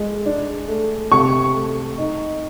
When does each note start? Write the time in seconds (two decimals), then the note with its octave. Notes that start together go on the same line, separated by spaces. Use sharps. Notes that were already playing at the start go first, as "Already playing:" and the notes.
Already playing: G#3
0.26 D4
0.68 A3
1.11 C3 C#6
1.54 A3
1.98 D#4